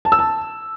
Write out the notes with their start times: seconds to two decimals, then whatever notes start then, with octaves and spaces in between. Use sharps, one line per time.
0.05 A5
0.12 E6
0.19 A5